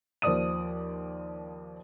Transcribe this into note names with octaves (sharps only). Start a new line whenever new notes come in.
D#2 F3 D5 D#6 D#7